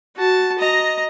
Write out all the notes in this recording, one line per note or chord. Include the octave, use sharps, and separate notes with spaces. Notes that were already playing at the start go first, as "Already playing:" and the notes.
F#4 A5
D#5 A#5